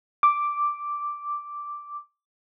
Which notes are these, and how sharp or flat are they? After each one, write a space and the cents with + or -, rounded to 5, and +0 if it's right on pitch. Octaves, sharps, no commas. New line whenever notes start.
D6 +0